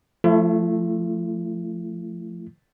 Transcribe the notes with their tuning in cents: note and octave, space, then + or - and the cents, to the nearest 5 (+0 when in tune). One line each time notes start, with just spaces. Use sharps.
F3 +0 A3 +0 E4 +45